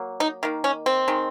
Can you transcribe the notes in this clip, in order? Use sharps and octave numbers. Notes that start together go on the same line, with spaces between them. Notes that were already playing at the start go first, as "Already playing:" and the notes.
Already playing: F#3 A#3
D#4
D#3 A#3
C#4
C4
D#3 G#3